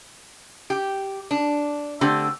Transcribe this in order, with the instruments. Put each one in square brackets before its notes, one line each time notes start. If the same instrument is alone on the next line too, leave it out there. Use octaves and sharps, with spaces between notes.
[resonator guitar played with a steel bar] G4
D4
D3 A3 C4 G4